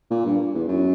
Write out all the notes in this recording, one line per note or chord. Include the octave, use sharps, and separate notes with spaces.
A#2
G2
E2
F#2